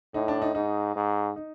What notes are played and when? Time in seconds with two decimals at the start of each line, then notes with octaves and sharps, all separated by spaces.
0.14 A2 D#4
0.28 D4
0.42 D#4
0.55 G#2 D#4
0.96 G#2
1.36 D#4